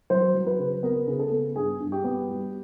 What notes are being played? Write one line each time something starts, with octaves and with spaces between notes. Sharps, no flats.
F#3 C5
F#3
B4
C#3
B3 A#4
C#3
A4
B3
G2 G#4
G2
G4
B3
G3